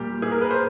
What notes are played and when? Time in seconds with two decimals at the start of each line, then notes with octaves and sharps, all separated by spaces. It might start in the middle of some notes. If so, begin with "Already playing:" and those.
Already playing: A#2 G3 A#3 G4
0.22 G#4
0.31 A#4
0.41 B4
0.50 C5